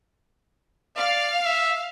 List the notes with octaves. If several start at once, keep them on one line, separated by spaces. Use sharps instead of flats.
D5 F5
E5